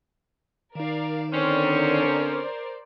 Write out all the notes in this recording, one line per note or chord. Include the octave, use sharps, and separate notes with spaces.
D#3 D#4 A#4 D5 F5
D3 C4 C#4 A#4 C5 D5